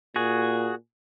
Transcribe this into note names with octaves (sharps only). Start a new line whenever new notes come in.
A#2 F#4 G#4